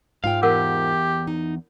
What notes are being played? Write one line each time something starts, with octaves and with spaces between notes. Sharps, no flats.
G#2 F4 F5 G5
E2 G4 A#4 F#5 E6
D#4